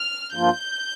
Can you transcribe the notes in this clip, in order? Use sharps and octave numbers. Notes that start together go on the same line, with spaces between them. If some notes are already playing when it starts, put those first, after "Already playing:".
Already playing: F6
G2 F3 A#3 F4 G6